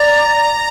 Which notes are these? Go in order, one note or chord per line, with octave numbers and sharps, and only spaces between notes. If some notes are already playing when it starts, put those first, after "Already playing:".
Already playing: D5 A#5